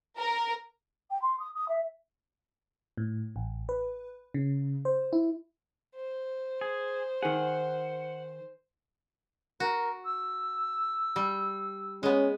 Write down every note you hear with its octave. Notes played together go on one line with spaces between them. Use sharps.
A#4
G5
C6
D#6
D#6
E5
A2
A1
B4
C#3
C5
E4
C5
G#4
D#3 G#4 F#5
F#4 A#4
E6
G3
G#3 B3 C#4